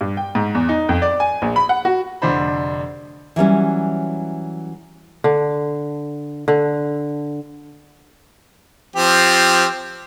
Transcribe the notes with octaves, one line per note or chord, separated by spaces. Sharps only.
G2
G5
G#2
E2
D#4
F2
D5
G#5
A#1
B5
F#5
F#4
F1 D3 D4 C5 B5
E3 F#3 G3 C#4
D3
D3
F3 C4 G4